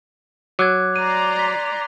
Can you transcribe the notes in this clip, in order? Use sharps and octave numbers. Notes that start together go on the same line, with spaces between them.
F#3 D6 F#6 G#6
D5 A#5 C6 D#7
B6